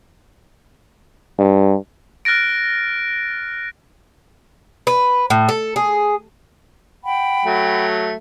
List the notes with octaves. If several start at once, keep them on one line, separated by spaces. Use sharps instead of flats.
G2
F6 F#6 A6 A#6 D7
B4
A2
A4
G#4
F#5 G5 B5
F#3 A3